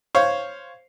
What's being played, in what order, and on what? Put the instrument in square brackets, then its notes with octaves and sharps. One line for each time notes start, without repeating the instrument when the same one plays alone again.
[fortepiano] C5 C#5 F5